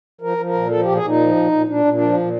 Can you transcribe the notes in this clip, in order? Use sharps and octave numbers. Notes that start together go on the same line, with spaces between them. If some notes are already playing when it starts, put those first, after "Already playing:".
F3 A#4
F3
A#4
A#2
F3 A4
A#2 G4
G#4
A#2 D#4
F3
A#2
A#2
A#2 D4
A#2
D4
F3
A#2